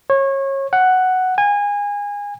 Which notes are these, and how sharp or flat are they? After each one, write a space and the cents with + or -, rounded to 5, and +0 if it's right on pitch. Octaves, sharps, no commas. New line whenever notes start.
C#5 -25
F#5 +5
G#5 -25